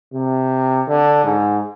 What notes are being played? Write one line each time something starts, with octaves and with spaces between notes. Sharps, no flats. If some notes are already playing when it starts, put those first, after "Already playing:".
C3
D3
G#2